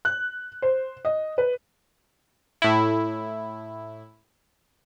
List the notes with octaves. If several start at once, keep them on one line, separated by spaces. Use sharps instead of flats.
F#6
C5
D#5
B4
A2 E4